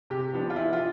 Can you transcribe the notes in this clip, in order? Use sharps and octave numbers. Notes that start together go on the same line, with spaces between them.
C3 G4
F3 B3 D4
F4
E3 E4
F4